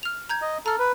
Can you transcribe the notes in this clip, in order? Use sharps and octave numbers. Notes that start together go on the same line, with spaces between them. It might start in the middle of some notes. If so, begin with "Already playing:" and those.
F6 F7
A#5 G6 G#6
D#5
A4 A#5 F6
B4